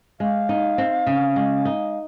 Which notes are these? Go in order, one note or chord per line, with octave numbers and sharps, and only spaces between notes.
G#3 F5
D#4
C4
C#3
G#3
D#4